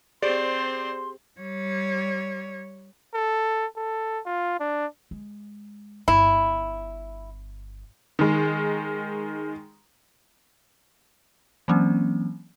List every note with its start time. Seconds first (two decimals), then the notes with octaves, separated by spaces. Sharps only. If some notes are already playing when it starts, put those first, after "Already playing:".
0.22 C4 G4 G#4 C5 D5 C6
1.40 G3 C#5
3.15 A4
3.77 A4
4.26 F4
4.60 D4
5.11 G#3
6.08 G1 E4
8.19 D#3 G#3
11.68 E3 F#3 A#3 C4 C#4